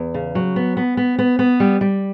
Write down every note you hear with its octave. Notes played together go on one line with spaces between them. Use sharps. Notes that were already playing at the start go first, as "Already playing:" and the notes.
Already playing: E2
C#3
F#3
B3
B3
B3
B3
B3
G3
G3